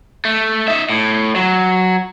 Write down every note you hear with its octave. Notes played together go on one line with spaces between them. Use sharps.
A3
D#4 E5
A2
F#3